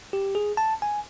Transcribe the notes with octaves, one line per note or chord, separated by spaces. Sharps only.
G4
G#4
A5
G#5